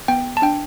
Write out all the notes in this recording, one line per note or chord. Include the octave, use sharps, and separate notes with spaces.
B3 G5
A5
D4 G5